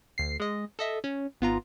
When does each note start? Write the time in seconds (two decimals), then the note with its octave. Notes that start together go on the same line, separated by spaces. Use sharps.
0.18 D2 C7
0.40 G#3 D#5
0.79 A4 D#5 E5
1.04 C#4
1.41 G#1 B3 F4 A#5